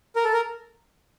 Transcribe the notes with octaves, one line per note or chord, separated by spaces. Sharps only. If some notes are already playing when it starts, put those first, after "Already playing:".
A#4
A4
A#4